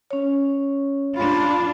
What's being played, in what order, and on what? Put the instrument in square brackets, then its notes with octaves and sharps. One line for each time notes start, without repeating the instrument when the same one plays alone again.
[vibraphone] C#4 C#5
[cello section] D4 F4 [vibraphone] B5